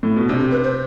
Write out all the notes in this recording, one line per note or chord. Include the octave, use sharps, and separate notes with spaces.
A2
B2
C3 D4
G4
B4
C5